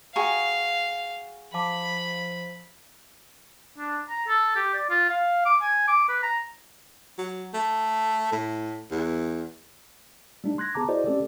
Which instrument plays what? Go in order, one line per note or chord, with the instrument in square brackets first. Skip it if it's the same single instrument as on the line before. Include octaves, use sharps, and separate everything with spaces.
[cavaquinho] F#4 G#4 C#6 [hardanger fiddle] F5 [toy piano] G5 G#5 A#5
[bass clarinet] F3 [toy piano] F5 A5 D6 [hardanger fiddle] B5
[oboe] D4
A#5
A4
G4
D5
F4
F5
D6
G#5
D6
B4
A#5
[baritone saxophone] F#3
A3
A2
E2
[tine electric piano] G3 A3 D4 D#4
C6 F#6 G#6 A#6
B3 G#4 A5 A#5 D6
E4 F#4 G#4 C5 D5 D#5
A3 C4 C#4 G4 A4 D5